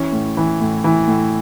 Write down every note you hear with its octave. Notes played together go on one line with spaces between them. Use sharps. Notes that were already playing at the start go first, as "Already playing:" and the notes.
Already playing: E3 C#4
A2
E3
A2
E3
A2